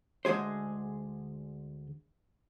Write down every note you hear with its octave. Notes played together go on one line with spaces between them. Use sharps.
D2 D3 G#3 G#4 C5